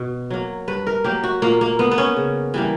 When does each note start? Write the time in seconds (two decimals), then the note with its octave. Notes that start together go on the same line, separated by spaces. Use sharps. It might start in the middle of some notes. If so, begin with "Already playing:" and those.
Already playing: B2
0.31 F#3 A#3
0.68 G2 B4
0.87 A#4
1.04 F#3 A#3 G4
1.23 F#4
1.42 A#2 A#3
1.61 A#3
1.79 A#3 B3
1.91 B3
1.98 C#4
2.16 C#3
2.54 E3 G3 A#3